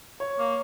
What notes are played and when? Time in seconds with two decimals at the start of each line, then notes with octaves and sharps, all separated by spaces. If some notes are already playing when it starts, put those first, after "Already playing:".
0.20 C#5
0.39 A#3